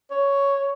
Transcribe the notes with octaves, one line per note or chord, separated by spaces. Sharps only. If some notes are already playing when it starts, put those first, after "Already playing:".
C#5